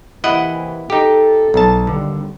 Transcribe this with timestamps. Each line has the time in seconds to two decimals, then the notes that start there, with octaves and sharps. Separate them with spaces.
0.24 C3 E3 A#3 E4 D#5 F#5
0.90 D#4 G4 A4
1.54 B1 A5
1.87 D#2 D3 G3